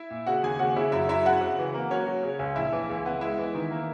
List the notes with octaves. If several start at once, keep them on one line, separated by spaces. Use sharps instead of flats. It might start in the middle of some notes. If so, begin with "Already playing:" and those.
Already playing: E4 E5
A#2
C#3 F#4 F#5
D#2 G#4 G#5
C#3 F#4 F#5
C#3 E4 E5
F#2 E4 E5
F#2 E4 E5
C#3 F#4 F#5
C#3
E3
A#3
F#3 C#4 C#5
F#3
C#3
C#2
A#1 E4 E5
E3
C#2
B3
G#3 E4 E5
E3
D#3
A#3